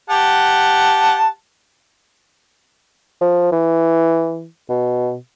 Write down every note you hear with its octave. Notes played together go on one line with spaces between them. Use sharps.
G4 F#5 A5
F3
E3
B2